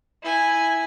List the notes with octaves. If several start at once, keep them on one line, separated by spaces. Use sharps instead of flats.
E4 G#5